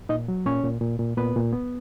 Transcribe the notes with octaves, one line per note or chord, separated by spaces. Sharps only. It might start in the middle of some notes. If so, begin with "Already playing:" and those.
A#2 D#4 D#5
F#3
A#2 C#4 C#5
A#2
A#2
A#2
A#2 B3 B4
A#2
B3